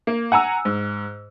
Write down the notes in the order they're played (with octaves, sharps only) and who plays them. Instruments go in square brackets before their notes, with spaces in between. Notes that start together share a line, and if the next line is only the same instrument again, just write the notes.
[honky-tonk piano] A#3
F#5 G#5 A#5 E6
G#2